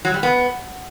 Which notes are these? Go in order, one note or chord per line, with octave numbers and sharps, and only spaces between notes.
F#3
G3
B3